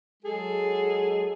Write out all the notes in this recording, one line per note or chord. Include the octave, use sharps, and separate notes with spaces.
F#3 G#3 G#4 A4